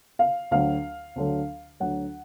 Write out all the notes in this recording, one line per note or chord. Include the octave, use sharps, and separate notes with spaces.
F5
D2 D3 F#3 F5
D2 D3 F#3
D2 D3 F#3 F#5